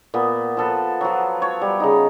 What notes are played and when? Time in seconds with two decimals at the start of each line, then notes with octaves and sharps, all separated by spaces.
0.14 A#2 B3
0.57 F3 A4 B4
1.01 F3 F#3
1.42 C#5
1.61 G3
1.80 C#3 D#4